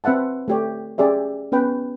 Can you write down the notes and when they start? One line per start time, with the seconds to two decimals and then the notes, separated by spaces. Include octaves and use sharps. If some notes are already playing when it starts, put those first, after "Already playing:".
0.04 C4 B4 E5 F#5 A5
0.48 A3 G4 C#5
0.98 C#4 G4 G#4 D5 E5
1.52 B3 C#4 B4 G5